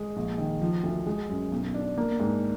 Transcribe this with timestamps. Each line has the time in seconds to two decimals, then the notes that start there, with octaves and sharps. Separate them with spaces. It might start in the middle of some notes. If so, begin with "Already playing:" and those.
Already playing: G#3
0.16 A#1
0.38 D#3
0.62 F3
0.83 D2
1.07 G#3
1.29 F#2
1.52 B1
1.74 D4
1.97 A#3
2.20 G#2